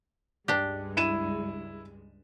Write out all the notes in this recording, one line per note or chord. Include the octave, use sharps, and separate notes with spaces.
C#2 G2 G#3 D4 G4
E4 D#7 E7